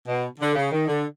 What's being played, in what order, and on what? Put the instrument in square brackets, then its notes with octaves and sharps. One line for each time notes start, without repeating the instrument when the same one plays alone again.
[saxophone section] B2
D3
C#3
D#3
D3